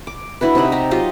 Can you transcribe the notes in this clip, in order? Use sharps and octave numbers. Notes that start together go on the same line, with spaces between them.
D6
D4 E4 F#4 B4
C3 D#4 D#5 B5
D#4 G4 A#5
F#3 F4 G4 D#5